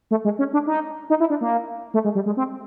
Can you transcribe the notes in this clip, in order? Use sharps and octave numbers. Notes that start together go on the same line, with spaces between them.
A3
G#3
C#4
D4
D#4
D#4
E4
D4
A#3
A3
G#3
G3
G#3
C4